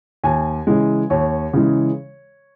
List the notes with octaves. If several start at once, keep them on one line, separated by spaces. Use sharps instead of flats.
D#2 G#5
C#3 E3 G#3
D#2 C#5
C#3 E3 G#3